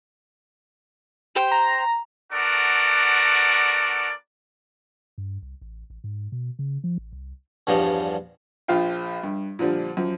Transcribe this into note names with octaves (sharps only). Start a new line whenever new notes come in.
G4 C5 G5
A#5
B3 D4 F#4 A4 A#4 D5
G2
C2
A1
A1
G#2
B2
C#3
F3
A1
C2
E2 G2 F3 G3 C#5 D#5
A#1 F3 F4 F5 G5
G2
A#2 D3 F3 G3
F#2 F3